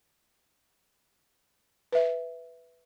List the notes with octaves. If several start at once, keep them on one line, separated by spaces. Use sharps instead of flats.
B4 E5